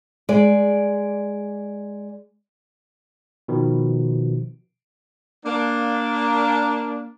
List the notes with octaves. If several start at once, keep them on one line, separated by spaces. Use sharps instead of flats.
G#3 D5
B2 D#3 F3
A#3 D4